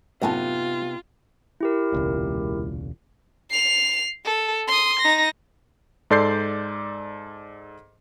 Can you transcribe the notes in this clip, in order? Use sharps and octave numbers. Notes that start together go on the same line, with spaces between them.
F#2 A2 C3 B3 D#4 F4 A5
E4 G4 A#4
E1 C#2 A#2
C7 F7
A4
C6 D#6
D#4 A#6
G#2 A4 D5 C6 G6 C7